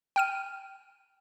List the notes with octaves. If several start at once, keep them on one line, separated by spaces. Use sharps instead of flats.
G5 F6 D#7